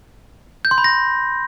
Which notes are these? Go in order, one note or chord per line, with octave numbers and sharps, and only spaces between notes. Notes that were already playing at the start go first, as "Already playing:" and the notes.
G6
C6
B5
A#6